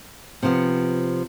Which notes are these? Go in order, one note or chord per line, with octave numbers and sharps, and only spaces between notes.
C3 F3 B3